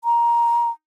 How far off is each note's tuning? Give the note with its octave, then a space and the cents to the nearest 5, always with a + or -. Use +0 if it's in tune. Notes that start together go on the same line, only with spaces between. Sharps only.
A#5 +15